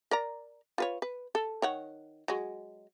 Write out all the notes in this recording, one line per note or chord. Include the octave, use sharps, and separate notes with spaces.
A#4 D5 A#5
F4 B4 C#5
B4
A4
D#3 C#5 F#5
F#3 G#3